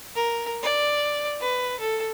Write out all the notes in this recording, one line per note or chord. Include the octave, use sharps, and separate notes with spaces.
A#4
D5
B4
A4